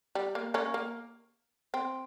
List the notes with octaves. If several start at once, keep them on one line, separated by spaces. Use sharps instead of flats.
G3
A#3
A#3 C#4
A#3
C4